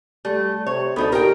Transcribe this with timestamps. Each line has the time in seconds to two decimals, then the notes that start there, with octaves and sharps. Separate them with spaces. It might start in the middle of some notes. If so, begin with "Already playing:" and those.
0.25 G3 A3
0.67 C3 C#5
0.96 D2 B3 D#4 A4
1.12 A#2 G4 A#4 G5